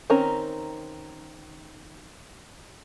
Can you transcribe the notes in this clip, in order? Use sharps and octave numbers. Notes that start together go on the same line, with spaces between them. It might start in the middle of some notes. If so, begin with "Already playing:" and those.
D#3 C4 C#4 A#4 A#5